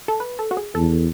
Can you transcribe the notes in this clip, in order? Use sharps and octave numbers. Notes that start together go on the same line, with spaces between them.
A4
B4
A4
F#4
G#4
E2 A4